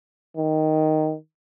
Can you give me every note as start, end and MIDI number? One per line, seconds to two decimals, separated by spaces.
0.37 1.15 51